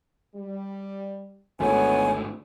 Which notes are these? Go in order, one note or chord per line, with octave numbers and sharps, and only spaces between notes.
G3
G#1 D2 G#2 A3 B3 C#5 G#5